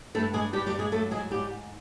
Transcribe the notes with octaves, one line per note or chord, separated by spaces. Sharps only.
G2 A3 A4
G2 G#3 G#4
G2 G3 G4
G3 G4
G2
G#3 G#4
F#3 A3 A4
G#2 G#3 G#4
G#2 G3 G4
G#2